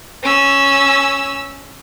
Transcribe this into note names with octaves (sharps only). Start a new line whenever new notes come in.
C#4 E6